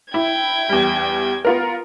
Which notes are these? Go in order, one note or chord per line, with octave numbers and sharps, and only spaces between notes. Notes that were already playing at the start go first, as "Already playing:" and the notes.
E4 G5 G#6
E2 G3
B3 F4 A#4